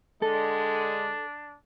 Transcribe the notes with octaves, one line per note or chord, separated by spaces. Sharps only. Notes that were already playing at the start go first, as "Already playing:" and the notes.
D3 G#3 D4 A4